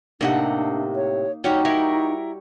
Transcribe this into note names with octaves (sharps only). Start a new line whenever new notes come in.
A2 C3 A#3 D4 D#4 F#5
C#5
G3 C#4 D#4 F#4 G4
E4 A#4 C#5